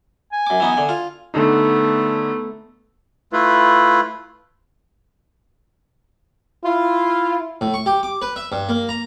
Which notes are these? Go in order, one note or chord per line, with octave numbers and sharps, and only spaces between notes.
G#5
F#2 D6
E3 B3 D#4
D3
F4
D3 A3 B3 D4 D#4
A3 E4 F4 B4
E4 F4
A2
C#6
G4
D6
B4
E5
G2
A#3
A#5